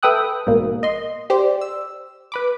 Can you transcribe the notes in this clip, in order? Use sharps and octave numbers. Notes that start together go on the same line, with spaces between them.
A4 B4 E5 G5 D#6 F#6
A#1 G#2 B2 A#3
D#5 C6
G4 C5 D5
E6
B4 B5 D6